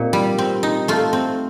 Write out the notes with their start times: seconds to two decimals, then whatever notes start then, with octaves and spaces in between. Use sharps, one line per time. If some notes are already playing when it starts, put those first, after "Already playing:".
Already playing: A#2 C4 D#4 G4
0.13 G3
0.38 C4
0.63 D#4
0.88 A3 F4
1.13 C4